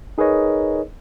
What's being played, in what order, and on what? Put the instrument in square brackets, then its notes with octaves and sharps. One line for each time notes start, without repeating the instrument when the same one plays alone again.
[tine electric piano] D#4 G#4 A#4 B4 C#5 D#5